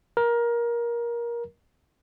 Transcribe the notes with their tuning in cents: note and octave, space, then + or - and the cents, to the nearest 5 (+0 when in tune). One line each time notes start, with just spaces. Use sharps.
A#4 +20